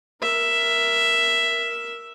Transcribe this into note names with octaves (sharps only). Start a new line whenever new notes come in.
A#4 E5